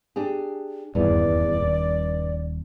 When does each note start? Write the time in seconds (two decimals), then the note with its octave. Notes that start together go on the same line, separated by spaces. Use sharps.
0.16 D4 G4 G#4
0.95 D#1 E2 G2 D5
1.60 D#1